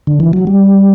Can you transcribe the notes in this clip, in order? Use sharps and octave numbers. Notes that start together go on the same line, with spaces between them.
D3
E3
F#3
G3